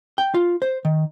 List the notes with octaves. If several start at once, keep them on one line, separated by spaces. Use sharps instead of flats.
G5
F4
C5
D#3